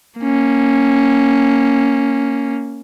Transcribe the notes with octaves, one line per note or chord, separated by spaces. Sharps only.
A#3 C#4